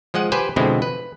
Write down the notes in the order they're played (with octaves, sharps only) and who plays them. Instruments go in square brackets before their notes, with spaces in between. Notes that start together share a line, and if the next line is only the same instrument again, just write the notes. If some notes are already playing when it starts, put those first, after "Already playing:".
[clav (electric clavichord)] F3 G#3 D#5 F#5
G4 B4 C5 G5 G#5
B2 D3 F3 G#3 C4 E4
B4